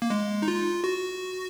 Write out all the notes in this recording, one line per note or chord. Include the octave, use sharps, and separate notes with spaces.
A#3
G#3
D#4
F4
F#4